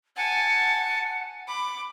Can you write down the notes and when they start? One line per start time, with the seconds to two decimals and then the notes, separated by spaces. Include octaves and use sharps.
0.17 F#5 G#5 A5
1.48 B5 D6